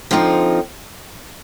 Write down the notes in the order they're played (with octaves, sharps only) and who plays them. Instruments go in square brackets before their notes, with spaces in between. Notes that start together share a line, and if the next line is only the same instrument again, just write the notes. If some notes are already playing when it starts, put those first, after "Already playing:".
[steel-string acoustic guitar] D3 F3 C4 D#4